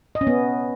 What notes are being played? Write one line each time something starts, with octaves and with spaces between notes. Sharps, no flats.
D#5
C#4
B3